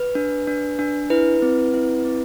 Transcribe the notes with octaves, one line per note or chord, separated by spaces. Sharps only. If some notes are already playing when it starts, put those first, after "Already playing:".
Already playing: B4
D4
D4
D4
E4 B4
C4
E4
C4